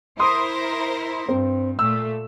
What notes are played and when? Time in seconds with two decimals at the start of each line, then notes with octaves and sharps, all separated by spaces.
0.19 E4 A#4 C5 C6 D#6
1.28 G2 C4
1.79 A#2 A3 E6